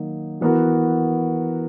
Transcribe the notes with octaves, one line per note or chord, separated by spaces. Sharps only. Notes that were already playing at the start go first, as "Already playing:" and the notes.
Already playing: D#3 F#3 A#3 D#4
E3 B3 F#4 A#4